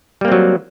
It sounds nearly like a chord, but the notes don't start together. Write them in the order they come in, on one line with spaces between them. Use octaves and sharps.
G3 A#3 C4 F#3